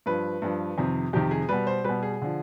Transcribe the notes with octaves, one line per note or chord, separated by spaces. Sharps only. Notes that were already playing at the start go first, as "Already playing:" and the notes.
G2 F3 B4
G2 F3
F2 C3 D#3
F2 C3 D#3 G4
G#4
B2 G3 B4
C5
B2 G3 B4
G#4
D3 F3